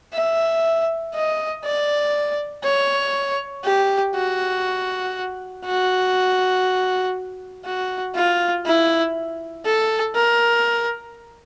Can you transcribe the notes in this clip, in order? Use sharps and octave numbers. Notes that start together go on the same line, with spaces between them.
E5
D#5
D5
C#5
G4
F#4
F#4
F#4
F4
E4
A4
A#4